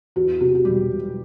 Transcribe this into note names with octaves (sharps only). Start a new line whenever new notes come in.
E2 F#4
C3 F#4
G4
F#4
E1 G3 G4
E1